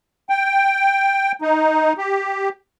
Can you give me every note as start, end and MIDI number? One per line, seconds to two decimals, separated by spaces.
0.29 1.32 79
1.42 1.93 63
1.98 2.49 67